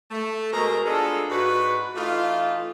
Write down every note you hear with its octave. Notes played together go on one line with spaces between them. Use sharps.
A3
B2 G#3 G#4 A#4 C5 A#5
B3 D4 F4 G#4 A4
G#2 F#4 B4
E3 A3 D#4 F4